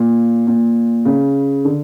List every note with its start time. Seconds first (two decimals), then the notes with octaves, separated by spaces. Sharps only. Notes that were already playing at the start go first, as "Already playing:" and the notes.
Already playing: A#2
0.47 A#2
1.05 C#3
1.65 D3